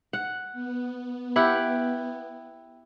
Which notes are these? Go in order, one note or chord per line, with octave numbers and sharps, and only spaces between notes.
F#5
B3
E4 G4 F#5